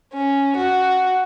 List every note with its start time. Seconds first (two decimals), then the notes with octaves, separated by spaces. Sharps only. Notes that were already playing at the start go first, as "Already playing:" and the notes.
0.13 C#4
0.56 F#4